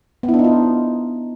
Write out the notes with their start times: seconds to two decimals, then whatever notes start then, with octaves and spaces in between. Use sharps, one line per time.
0.23 B3
0.28 E4
0.34 D4
0.39 D#4
0.44 F4